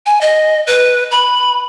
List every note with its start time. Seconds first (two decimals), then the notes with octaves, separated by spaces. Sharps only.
0.06 G#5
0.21 D#5
0.67 B4
1.11 B5